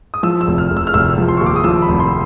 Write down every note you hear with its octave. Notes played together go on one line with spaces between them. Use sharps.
D#6
F3 E6
E6
F1
F6
F1
E6
F6
F1 E6
F3
C6
D#2 C#6
D6
D#6
F3 E6
B5
F1
C6